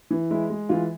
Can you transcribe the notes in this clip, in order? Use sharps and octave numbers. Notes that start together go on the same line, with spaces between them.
E3
G#3 E4
G#3
E3 F4